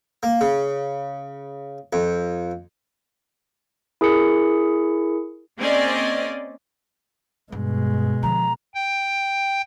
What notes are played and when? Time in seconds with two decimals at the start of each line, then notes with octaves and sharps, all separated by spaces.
0.23 A#3
0.41 C#3
1.93 F2
4.01 E4 G#4 A#4 C#7
5.59 A#3 C4 C#4 G#4 D5 D#5
7.52 G2 B2 G#3
8.23 D3 F3 A#5
8.75 G5